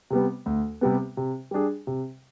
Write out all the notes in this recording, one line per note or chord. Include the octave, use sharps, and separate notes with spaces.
C3 G3 B3
D2
C3 G3 B3
C3
G3 D4 G#4
C3